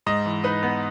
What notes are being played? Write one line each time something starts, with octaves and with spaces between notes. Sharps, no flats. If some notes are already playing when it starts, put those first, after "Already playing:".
G#2 D#5
E3
D#4 B4
B3